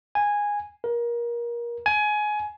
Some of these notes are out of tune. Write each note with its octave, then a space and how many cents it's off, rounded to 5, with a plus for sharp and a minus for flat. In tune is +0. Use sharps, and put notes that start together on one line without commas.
G#5 -10
A#4 +25
G#5 +20